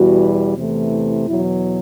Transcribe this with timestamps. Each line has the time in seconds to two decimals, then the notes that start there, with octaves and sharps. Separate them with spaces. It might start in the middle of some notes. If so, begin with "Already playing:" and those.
Already playing: E2 B2 G3 F#4
0.56 E2 C3 E3 A3
1.27 E2 B2 F#3 E4